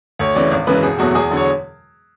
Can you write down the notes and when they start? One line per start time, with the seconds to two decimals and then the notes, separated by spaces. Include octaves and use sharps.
0.19 D2 C#5
0.35 C#3 E3 D5
0.51 G#1
0.67 F#2 C#3 E3 G#3 B4
0.83 E1 G#4
0.98 E2 B2 F#3 A3 F#4
1.15 E2 G#4
1.31 D3 F#3
1.36 C#5